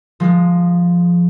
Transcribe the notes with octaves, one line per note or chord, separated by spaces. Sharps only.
F3 G#3